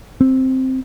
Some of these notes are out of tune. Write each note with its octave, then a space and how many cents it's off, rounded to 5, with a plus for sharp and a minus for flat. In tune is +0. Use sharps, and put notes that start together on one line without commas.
C4 +0